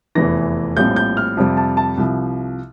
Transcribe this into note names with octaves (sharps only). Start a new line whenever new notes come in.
F1 E2 E3 A#6
A#1 A2 G3 C4 G6
G6
F6
F2 C3 G3
A5
A5
C2 C3 F3